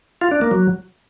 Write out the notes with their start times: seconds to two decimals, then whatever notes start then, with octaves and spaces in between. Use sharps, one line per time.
0.21 F4
0.31 D4
0.41 A#3
0.51 F#3